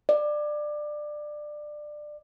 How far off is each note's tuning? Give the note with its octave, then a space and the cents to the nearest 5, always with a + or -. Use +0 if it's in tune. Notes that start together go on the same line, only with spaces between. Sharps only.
D5 +20